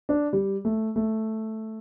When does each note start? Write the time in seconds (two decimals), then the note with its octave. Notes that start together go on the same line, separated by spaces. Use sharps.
0.09 D4
0.33 G3
0.65 A3
0.96 A3